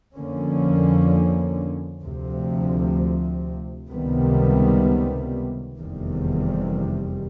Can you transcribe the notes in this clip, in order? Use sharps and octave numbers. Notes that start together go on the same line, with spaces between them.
F2 D3 F3 A#3 C#4
D2 C3 F3
C#2 C3 D#3 G3 B3
F1 E2 C3 D#3 G3